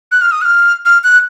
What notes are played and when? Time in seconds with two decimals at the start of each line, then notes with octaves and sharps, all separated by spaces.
0.12 F#6
0.22 F6
0.32 D#6
0.41 F#6
0.45 F6
0.85 F6
1.04 F#6